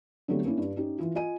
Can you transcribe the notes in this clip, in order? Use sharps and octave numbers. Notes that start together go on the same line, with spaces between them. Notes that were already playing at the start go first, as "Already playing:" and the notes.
D3 F#3 G3 A3 B3 C4
A#3 C#4 D4 E4
G2
C#4 D#4 G4
E3 F4
F4 D#5 G#5 D#7